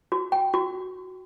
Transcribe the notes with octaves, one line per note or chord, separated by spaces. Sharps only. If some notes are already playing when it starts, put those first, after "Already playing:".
F#4
G5
F#4